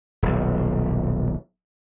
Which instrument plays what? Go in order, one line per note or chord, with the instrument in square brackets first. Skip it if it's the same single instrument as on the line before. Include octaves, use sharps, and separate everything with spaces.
[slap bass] D#1 B1